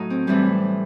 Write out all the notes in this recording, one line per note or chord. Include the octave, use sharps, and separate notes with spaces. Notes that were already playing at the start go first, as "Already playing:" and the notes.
Already playing: A2 F#3 A3 D#4
C4
A2 E3 G3 C4